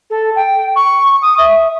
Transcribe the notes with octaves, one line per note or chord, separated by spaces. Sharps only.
A4
G5
C#6
D#6
E5